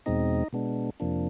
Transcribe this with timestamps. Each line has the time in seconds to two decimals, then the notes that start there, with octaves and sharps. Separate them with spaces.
0.06 E2 B2 G#3 C4 D#4 D#5
0.53 B2 G#3 B3 D4
1.00 F2 C3 F3 A#3 D4